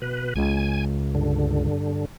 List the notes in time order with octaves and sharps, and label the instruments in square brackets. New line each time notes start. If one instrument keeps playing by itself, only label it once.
[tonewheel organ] B2 B4
[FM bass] C#2 [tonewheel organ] G#5
[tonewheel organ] G2 D3